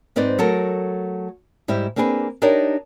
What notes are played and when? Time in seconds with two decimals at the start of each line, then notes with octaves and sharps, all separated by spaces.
0.16 G#2 C4 D#4 B4 D5
0.39 F#3 A3 A4 A#4
1.68 G#2 G3 E4 G4
1.96 A#3 C4 D4 G#4 A#4 B4
2.42 D4 D#4 G4 A#4 C#5 D5